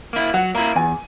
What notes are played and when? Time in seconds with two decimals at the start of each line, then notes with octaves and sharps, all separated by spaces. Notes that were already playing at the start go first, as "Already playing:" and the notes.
0.13 A#3 E4
0.34 F#3 F#5
0.55 A#3 E4 A#5
0.75 E2 G#5